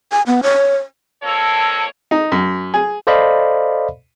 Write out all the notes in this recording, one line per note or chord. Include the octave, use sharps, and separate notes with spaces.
G#5
B3
C#5
F2 A#3 C#5 A5 E6
D#4
F#2
G#4
A4 C5 D5 D#5 F5 B5